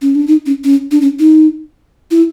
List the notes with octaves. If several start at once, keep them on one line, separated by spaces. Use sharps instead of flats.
C#4
D4
D#4
C#4
C#4
D4
C#4
D#4
E4